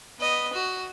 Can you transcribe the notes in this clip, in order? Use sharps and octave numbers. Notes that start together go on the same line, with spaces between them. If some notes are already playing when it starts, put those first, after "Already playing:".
B3 D#5
F#4